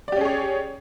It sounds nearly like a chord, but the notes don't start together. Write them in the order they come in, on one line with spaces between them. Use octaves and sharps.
D5 G4 C#4 G#4 C#5